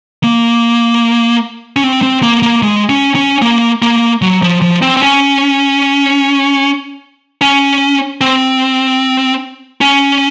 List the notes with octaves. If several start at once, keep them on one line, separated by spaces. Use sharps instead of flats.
A#3
C#4
C4
C4
A#3
A#3
G#3
C#4
C#4
A#3
A#3
F#3
F3
F3
C4
C4
C#4
C#4
C4
C#4